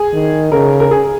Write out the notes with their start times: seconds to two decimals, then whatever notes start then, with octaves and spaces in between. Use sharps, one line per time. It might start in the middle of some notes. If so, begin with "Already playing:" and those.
Already playing: G#4
0.13 D#3
0.52 C#3 A#4
0.80 A#4
0.91 G#4